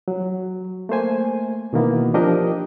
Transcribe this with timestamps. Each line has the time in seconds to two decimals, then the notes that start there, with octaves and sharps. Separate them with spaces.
0.08 F#3
0.89 A3 A#3 C5 G#5
1.73 B2 D#3 E3 A#3 B3
2.14 F3 D4 G4 A#4 D#5